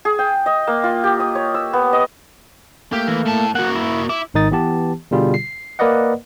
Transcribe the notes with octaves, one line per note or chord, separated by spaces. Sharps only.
G#4
G5
D#5
A#3
F4
G4
D#6
C#5
E6
B3
D#5
A3 A#3 G4
E3
A2 A5
A#3 F#4 F#5
E4
E4 D6
G#1 G#2 D#3 D#4 D#6 A6
E3 B3 G4 A5
B2 D3 G3 F4 G#4
C7
A#3 A#4 B4 D5 D#5 F#5